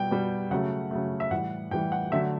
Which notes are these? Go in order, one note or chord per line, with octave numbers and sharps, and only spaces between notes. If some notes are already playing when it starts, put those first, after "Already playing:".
Already playing: B2 G3 G5
B2 G3
C#3 F#3 A3 F#5
C#3 F#3 A3
E5
A2 E3 G3 F#5
A2 E3 G3 G5
F#5
D3 F#3 A3 E5